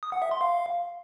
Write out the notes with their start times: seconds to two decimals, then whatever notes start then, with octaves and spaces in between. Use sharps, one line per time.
0.03 D#6
0.12 F#5
0.22 E5
0.31 C6
0.41 F5